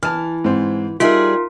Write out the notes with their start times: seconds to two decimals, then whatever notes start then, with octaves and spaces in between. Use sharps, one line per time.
0.03 E3 A5 F6
0.44 G#2 C4
1.00 G3 D#4 F4 G#4 A#4 E5 G#5